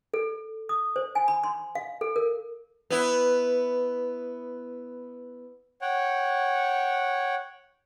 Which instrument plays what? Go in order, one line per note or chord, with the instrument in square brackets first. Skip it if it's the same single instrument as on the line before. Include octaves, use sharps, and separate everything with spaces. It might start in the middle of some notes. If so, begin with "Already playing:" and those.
[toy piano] A4
D#6
C5
G#5
B5
C6
F5
A4
A#4
[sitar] B3 E4
[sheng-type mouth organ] C#5 F#5 G5